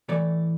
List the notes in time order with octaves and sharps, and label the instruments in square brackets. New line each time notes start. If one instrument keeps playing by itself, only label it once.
[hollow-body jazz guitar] A2 E3 A3 D5